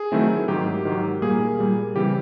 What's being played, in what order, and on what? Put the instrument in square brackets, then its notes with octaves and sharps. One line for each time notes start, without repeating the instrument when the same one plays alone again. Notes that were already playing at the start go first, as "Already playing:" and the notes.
Already playing: [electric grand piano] G#4
D#3 F#3 A3 C4 E4
G#2 D#3 F#3 G4
G#2 D#3 F#3
A#2 G3 A#3 G#4
A#2 G3 A#3
C#3 E3 G3 C4 G4